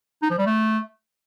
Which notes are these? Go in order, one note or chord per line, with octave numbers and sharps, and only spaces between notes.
D#4
F3
G3
A3